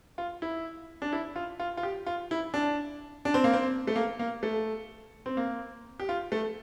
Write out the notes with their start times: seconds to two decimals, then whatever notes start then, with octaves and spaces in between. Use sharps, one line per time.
0.18 F4
0.42 E4
1.02 D4
1.13 E4
1.36 F4
1.60 F4
1.77 F4
1.83 G4
2.06 F4
2.31 E4
2.54 D4
3.25 D4
3.34 C4
3.44 A#3
3.53 C4
3.87 A3
3.96 A#3
4.19 A#3
4.43 A3
5.26 C4
5.37 A#3
6.00 G4
6.09 F4
6.32 A3